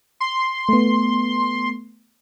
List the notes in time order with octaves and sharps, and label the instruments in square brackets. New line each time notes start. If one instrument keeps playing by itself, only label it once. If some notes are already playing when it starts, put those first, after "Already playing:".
[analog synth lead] C6
[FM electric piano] A3 B3